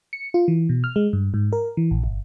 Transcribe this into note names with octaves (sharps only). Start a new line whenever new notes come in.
C#7
F4
E3
B2
F6
G#3
G2
G#2
A#4
E3
A#1
G1